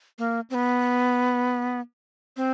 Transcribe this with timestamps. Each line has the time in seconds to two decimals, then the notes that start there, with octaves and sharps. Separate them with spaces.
0.19 A#3
0.50 C4
0.54 B3
2.37 C4